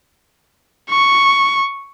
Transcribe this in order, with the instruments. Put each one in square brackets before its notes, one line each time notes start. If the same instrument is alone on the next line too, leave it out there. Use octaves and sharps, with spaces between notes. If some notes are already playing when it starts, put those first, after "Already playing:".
[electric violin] C#6